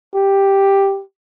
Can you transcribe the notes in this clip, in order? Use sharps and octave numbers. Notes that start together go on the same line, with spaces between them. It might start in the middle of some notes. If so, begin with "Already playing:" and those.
G4